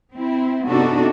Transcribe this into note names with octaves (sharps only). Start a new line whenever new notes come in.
C4 E4
C3 B3 D4 D#4 F#4 A4